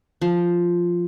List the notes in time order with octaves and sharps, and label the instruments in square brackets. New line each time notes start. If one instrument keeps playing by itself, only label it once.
[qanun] F3